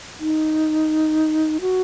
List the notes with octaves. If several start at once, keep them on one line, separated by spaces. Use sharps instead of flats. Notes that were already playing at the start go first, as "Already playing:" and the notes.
D#4
F#4